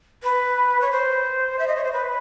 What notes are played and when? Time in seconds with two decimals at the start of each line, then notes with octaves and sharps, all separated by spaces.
0.23 B4
0.81 C#5
0.91 C5
1.59 E5
1.67 D#5
1.76 C#5
1.84 C5
1.93 B4